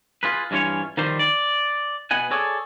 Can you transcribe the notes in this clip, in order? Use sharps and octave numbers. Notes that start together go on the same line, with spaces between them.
F4 G#4 B4
G2 E3 C#4 F4 C#5
D#3 F3 G3 C5
D5
B2 B3 F#5 G#5
G#4 A4 C#5 D5